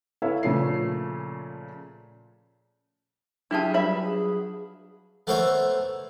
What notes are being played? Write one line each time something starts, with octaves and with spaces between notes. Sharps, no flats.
E4 A4 B4 C#5 E5 F5
A#2 C#3 F3 A3 C#5 C7
F#3 D4 E4 F4 G4 G#4 E5 A5
G3 B4 E5 B5
G#4
A3 B3 A#4 C5 C#5 E5